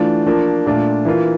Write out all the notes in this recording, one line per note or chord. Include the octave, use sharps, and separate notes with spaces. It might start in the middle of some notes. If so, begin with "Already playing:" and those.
Already playing: E3 A3 D4 F4
F3 A#3 D4
A#2 A3 D4 F4
E3 A#3 F4